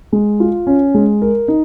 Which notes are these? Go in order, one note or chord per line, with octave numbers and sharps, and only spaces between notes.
G#3
F4
C#4
G#3
A#4
D#4